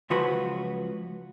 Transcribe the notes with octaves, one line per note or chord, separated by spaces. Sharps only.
C#2 F3 F#3 F#4 B4 B5